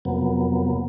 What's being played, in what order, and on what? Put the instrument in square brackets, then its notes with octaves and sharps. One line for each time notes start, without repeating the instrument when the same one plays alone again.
[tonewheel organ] F2 C3 F#3 A#3 B3